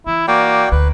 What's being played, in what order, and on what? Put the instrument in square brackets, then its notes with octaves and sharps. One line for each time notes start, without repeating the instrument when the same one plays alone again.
[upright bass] E3 [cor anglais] E4
[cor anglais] A#3 [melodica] F#4 D5 G5
[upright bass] D2 [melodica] B4